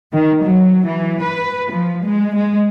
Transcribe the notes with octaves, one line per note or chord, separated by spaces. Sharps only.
D#3
F#3
E3
B4
F3
G#3
G#3